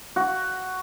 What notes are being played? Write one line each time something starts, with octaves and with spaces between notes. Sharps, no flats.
F#4